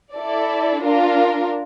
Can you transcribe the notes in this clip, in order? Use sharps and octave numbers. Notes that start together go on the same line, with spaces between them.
E4 A4 D5
D4 F4 A#4